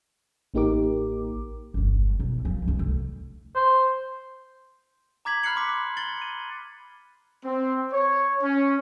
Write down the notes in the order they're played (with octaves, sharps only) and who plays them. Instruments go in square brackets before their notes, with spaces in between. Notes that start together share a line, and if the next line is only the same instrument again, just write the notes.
[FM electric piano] A1 A#3 D#4 G4 A#4 D6
[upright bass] G1 D3
B1
F3
F1 C2
D2
[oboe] C5
[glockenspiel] A#5 D6 G#6 B6 F#7
B5 F6 F#6 C7 C#7 F#7
C6 D6 B6
D6
A6 C#7 F#7 G7
D#7
[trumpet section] C4
C#5
C#4